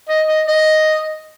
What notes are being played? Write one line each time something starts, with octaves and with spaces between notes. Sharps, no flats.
D#5
D#5
D#5